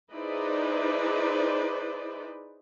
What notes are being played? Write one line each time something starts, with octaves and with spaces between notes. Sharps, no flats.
D#4 E4 G#4 B4 C5 D5